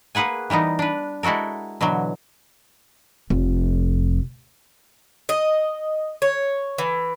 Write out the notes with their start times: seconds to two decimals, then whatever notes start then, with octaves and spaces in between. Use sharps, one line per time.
0.15 A#3 G#4 B4 F#5 G#5
0.50 E3 G3 B3 D#4
0.79 D4 B4
1.23 G#3 E4 F#4 A4 A#4
1.81 B2 D3 E3 F#3
3.30 F1
5.29 D#5
6.22 C#5
6.78 E3